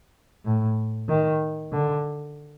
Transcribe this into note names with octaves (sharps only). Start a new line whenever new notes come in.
A2
D#3
D3